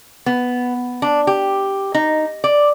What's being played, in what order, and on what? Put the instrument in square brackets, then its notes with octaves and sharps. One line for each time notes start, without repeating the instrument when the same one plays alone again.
[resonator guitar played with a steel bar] B3
D4
G4
D#4
D5